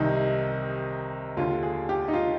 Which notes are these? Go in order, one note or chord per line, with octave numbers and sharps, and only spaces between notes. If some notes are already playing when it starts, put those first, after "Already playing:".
Already playing: C2 C3 D#3 D#4
D#2 D3 F4
G#4
G4
D#4
F4